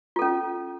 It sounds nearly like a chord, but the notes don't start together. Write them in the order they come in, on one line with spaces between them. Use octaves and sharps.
F4 A4 C#4